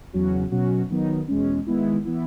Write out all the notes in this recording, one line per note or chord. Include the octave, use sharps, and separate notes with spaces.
E2 C#3 F#3 C#4 F#4
B2 F#3 C#4 F#4
D#3 F#3 B3 D#4
E2 B2 G#3 C#4
D#3 G#3 B3 E4
E3 B3 E4